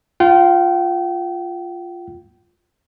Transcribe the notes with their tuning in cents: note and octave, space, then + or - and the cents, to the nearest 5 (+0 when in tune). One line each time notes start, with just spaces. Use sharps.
F4 +0 G5 -35